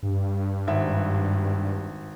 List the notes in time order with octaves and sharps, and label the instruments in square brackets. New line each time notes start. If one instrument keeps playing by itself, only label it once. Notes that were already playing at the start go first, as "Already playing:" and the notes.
[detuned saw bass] G2
[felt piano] G#1 E5